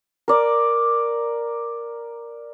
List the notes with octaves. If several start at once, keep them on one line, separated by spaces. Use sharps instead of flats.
A#4 D5